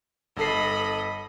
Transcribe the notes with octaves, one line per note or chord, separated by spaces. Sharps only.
G1 A4 D#5 B5 C7